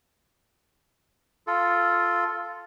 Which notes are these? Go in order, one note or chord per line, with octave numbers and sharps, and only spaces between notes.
F4 A4